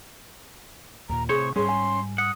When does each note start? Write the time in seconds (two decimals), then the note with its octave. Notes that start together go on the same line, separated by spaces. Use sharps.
1.09 D#2 A#2 A#5
1.29 A2 C3 G#4 C5 C#5 C#6
1.56 G#2 G3 C#4 G#4 B4 C#5 C6
1.69 G#5
2.18 F#5 D#6